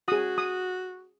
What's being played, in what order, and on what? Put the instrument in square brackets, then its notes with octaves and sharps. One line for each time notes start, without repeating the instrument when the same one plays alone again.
[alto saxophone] F#4 [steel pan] G#4 D#6
[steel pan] D#6